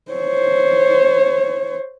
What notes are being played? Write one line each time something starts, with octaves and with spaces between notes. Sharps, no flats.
C5 C#5